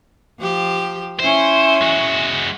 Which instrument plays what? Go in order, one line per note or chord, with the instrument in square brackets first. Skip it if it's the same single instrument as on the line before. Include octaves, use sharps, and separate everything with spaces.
[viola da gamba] F3 G4
[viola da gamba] C#4 E4 [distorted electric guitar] C5
[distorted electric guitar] G#3 F#4